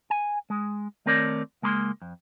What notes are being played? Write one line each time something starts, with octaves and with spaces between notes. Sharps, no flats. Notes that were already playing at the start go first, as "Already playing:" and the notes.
G#5
G#3
D#3 A3 C4 A#4 C#5 D5
C#2 G#3 A#3 B5 C6
F2